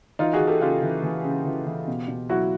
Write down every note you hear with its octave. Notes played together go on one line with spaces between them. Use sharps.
E3 D#4 F4
F#4 G#4
E3
G4 A4
C#3 F4 G4
E3
E3
C#3
E3
E3
B2
B2
F#3 E4 F#4